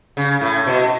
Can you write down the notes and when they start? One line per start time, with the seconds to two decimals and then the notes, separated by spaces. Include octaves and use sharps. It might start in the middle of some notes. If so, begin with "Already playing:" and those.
0.17 C#3
0.41 A2
0.67 B2